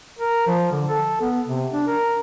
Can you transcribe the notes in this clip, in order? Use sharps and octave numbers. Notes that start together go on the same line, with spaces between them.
A#4
F3
D3
A4
B3
C3
D4
A#4